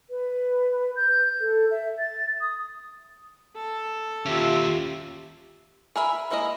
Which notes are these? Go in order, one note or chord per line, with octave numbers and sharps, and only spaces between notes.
B4
G6
A4
E5
A6
D#6
A4
D#2 C#4 F4 G4 E5
G#4 A#4 E5 B5
G#3 A#3 E4 A#4 D#5